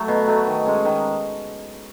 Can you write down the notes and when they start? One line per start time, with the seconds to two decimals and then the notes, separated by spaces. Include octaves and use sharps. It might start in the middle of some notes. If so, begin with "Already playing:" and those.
Already playing: F#3 A3
0.08 B2
0.28 F#3 A3
0.47 D#3
0.66 G#3 C#4
0.85 D#3